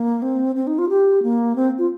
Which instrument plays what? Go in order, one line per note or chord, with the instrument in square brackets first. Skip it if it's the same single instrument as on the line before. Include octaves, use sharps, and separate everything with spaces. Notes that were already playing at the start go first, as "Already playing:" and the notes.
Already playing: [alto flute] A#3
C4
C4
D#4
F4
G4
A#3
C4
F4